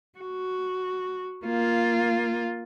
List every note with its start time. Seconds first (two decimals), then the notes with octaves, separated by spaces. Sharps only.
0.19 F#4
1.45 A#3 F4